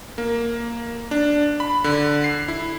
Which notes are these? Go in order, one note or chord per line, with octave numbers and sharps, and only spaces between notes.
A#3
D4
B5
D3
C7
E4